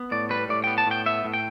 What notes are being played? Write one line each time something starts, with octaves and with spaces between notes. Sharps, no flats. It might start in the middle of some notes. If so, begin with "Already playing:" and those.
Already playing: B3
A2 D5
G3 B4
A2 D5
B3 G5
A5
A2 G5
B3 E5
A2
G5